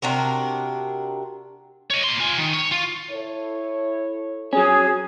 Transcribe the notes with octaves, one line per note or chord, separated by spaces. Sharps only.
C3 D4 F#4 A#4
C#5 D#5
A#3 C6
F4 G#5
D#3
C#5
F4
E4 A4 C#5
F#3 C#4 G#4